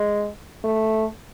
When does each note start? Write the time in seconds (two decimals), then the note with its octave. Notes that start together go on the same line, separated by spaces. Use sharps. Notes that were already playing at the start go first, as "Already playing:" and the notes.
Already playing: G#3
0.64 A3